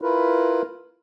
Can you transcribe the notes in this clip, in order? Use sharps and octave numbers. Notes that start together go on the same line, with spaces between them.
E4 F4 A#4 B4